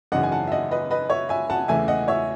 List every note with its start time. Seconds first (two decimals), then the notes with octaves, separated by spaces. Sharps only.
0.12 G#1 F#2 C#3 E3 D#5 F#5
0.23 G#5
0.32 F#5 A5
0.47 E5
0.52 D#5 F#5
0.71 B4 D#5
0.91 B4 D#5
1.10 C#5 E5
1.29 E5 G#5
1.50 F#5 A5
1.68 E2 C#3 E3 A3 E5 G#5
1.88 D#5 F#5
2.08 C#5 E5